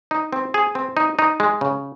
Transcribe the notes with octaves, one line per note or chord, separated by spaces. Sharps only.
D#4
C4
G#4
C4
D#4
D#4
G#3
C#3